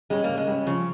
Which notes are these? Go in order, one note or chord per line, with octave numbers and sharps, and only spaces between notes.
G3 G#3 C#4
C#3 A#3
G#3
G3 C#4
C#3 F3